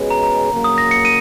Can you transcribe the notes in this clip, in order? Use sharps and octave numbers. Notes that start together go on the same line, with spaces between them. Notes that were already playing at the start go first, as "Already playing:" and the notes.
Already playing: B2 G#3 C#4 G#4 B4
A#5
A#5
C#3 F#3 A#3
D#6
A#6
C#7
D#7